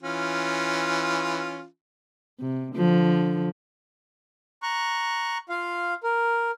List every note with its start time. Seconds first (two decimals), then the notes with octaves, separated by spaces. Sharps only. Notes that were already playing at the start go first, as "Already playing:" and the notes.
0.03 E3 C#4 F4
2.40 C3
2.75 D3 F3
4.63 A#5 C#6 F#6
5.49 F4 F5
6.03 A#4